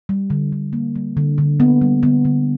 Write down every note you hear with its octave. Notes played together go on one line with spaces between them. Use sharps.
G3
D3
D3
A#3
G3
D3
D3
A#3 B3
G3
D3 B3
D3